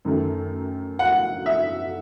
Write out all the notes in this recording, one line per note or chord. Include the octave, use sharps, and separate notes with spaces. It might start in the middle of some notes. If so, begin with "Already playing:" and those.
F#2 D#3 A3
F#5
E5